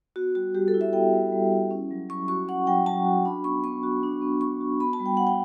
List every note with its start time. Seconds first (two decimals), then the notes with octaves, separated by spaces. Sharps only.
0.16 B3 F#4
0.35 G3 F#4
0.54 G3 G4
0.68 A4
0.74 E4
0.81 E5
0.93 B3 G5
1.13 G3
1.32 G3
1.52 E4
1.71 C#4
1.91 F#3
2.09 F#3 C#6
2.28 F#4 C#6
2.48 C#4 F#5
2.67 F#3 G5
2.86 F#3 A5
3.06 F#4
3.25 D4 B5
3.44 B3 C#6
3.64 B3 C#6
3.83 F#4
4.03 D4
4.22 B3
4.41 B3 C#6
4.61 F#4
4.80 B3 B5
4.93 A5
4.99 G3
5.06 G5
5.17 G3 F#5
5.27 G5